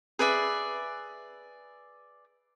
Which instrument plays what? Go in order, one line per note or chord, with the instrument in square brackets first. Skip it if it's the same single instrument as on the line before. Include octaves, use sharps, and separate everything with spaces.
[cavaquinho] G#4 B4 D5 E5